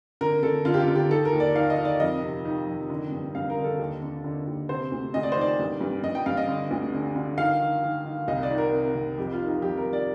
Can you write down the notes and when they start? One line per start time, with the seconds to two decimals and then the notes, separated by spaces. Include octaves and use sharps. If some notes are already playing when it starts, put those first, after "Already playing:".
0.21 D3 A#4
0.43 D3 A4
0.65 D3 F4
0.74 G4
0.80 F4
0.88 D3
0.95 G4
1.10 D#3 A4
1.25 A#4
1.33 D#2
1.40 D5
1.55 D#3 F5
1.70 D#5
1.77 D#3
1.85 D5
2.00 F2 D#5
2.22 C3
2.45 D#3
2.68 F2
2.90 D3
3.12 G2
3.35 G2 F5
3.50 A#4
3.57 D3
3.64 A4
3.79 D#2
4.02 D3
4.24 D3
4.47 D#2
4.69 C3 C5
4.92 D2
5.14 D2 D#5
5.23 D5
5.32 C5
5.36 D#3 D5
5.59 G2
5.81 G2
6.03 G2 D#5
6.15 G5
6.26 G2 F5
6.37 D#5
6.48 D3
6.71 D2
6.93 D3
7.16 D3
7.38 D#3 F5
7.61 D#3
7.83 D#3
8.06 D#3
8.28 C2 D#5
8.43 D5
8.50 D#3
8.58 A#4
8.72 C3
8.95 C2
9.18 F2 G4
9.32 F4
9.40 D#3
9.48 D#4
9.62 F2 G4
9.77 A#4
9.85 F2
9.93 D5